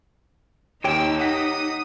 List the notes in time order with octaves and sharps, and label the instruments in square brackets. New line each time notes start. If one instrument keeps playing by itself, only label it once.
[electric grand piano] D#2 [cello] D#4 [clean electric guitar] G4 C#5 G5 [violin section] E6
[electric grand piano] F#5 B6 [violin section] D#6